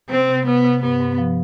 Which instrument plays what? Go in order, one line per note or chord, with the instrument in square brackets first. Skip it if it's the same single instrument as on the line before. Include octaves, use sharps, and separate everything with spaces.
[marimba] C3 [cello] C4
[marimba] C3
[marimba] C3 [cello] B3
[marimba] C3
[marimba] G2 [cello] B3
[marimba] G2
F3